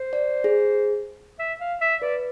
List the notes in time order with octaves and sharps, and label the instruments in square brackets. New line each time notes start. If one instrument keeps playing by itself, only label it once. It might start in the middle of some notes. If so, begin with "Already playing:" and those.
Already playing: [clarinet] C5
[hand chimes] D5
G#4
[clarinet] E5
F5
E5
[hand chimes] B4 [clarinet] D5